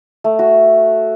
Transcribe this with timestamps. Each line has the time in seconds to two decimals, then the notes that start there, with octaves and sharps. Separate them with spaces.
0.24 A3
0.39 F#4